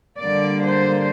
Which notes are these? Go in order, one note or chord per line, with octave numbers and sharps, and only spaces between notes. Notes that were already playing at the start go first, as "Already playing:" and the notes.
D3 G3 A#3 D5
C5